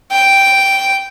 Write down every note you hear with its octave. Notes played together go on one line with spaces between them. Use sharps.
G5